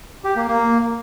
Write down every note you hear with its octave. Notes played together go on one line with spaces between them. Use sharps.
G4
A#3
A#3